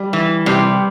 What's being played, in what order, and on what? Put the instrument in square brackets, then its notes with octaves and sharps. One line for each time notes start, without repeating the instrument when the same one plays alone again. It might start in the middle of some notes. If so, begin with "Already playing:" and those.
Already playing: [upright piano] G3
[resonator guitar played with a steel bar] E3
[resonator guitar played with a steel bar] C3 [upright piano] G3